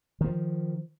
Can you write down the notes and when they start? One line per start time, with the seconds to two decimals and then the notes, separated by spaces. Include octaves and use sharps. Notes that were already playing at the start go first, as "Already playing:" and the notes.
0.21 D#3 F3